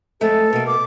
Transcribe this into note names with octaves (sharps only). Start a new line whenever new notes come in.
F2 G#3 A3 A4
B2 A#3
D6